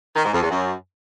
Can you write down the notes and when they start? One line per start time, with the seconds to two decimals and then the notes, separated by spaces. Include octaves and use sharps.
0.16 D#3
0.24 G#2
0.33 F2
0.41 E2
0.50 F#2